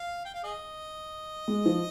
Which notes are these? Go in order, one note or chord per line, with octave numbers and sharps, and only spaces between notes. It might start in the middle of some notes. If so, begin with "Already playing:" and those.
Already playing: F5
G5
F5
G#4 D#5
G#3
F3